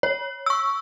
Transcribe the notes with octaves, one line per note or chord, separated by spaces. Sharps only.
C#5
C#6 E6